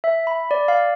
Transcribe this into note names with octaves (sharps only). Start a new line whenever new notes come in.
E5
B5
D5
F5